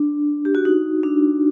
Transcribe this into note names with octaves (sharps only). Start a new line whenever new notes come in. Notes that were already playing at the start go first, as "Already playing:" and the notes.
Already playing: D4
G4
F#4
D#4
D4